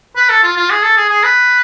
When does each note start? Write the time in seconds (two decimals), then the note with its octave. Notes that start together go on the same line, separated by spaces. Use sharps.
0.16 B4
0.29 A4
0.43 F4
0.57 F4
0.70 G#4
0.83 A4
0.97 G#4
1.09 G#4
1.24 B4